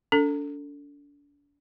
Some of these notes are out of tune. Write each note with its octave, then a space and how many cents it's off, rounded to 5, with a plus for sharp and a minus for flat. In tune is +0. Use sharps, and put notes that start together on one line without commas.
D4 -35 A4 +20